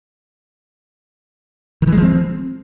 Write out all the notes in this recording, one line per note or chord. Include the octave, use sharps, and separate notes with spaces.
D#3
E3
G#3
F3
C4